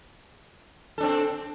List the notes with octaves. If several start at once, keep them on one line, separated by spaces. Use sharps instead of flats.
C4 D4 A4